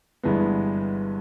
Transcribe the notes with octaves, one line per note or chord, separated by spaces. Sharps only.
G1 G2 E3 G#3 B3